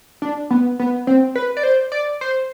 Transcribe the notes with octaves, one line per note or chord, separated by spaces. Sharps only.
D4
B3
B3
C4
B4
D5
C5
D5
C5